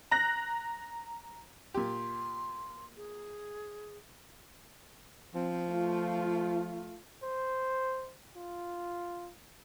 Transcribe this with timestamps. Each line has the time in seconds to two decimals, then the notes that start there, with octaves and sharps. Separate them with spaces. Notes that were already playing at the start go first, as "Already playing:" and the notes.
0.11 A#5 F#6 A#6
1.74 A#2 G4 C6
2.97 G#4
5.35 F3 C4
5.68 A3 F4
7.23 C5
8.36 F4